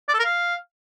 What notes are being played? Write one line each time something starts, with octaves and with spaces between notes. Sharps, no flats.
D5
A4
A#4
F5